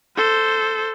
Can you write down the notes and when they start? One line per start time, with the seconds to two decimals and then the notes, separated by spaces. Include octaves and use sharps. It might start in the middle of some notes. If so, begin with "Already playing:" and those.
0.17 A4 C5